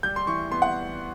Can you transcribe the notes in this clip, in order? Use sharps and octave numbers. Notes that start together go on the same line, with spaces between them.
G3 G6
C6
E3 C#6
B3 C6
F#5